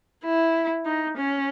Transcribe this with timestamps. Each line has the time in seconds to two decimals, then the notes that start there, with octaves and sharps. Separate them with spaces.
0.25 E4
0.86 D#4
1.17 C#4